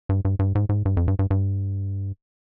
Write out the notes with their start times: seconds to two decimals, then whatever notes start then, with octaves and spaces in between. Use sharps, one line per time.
0.09 G2
0.25 G2
0.39 G2
0.55 G#2
0.69 G#2
0.85 G2
0.97 F2
1.08 G2
1.19 G2
1.30 G2